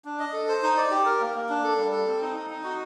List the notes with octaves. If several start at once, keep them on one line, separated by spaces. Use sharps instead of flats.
D4
D#5
A4
C5
D#4
D5
G4
A#4
A#3
A#3
D4
A4
G3
A4
C4
D#4
D#4
D#4
F#4